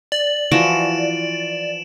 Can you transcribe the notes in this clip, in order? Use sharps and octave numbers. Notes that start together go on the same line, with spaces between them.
D5 F#7
E3 F3 F#4 D7 E7